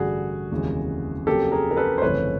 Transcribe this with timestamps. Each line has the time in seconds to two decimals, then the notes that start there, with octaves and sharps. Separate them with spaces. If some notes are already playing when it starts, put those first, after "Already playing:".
Already playing: A1 G2 D3 F#4 G#4
0.51 F1 D#2 C#3 E3 G#3
1.27 F2 C#3 F#3 A#3 G4 A4
1.52 G#4 A#4
1.71 A#4
1.77 A4 B4
1.98 C5
2.02 G1 F2 C#3 E3 A3 B4 C#5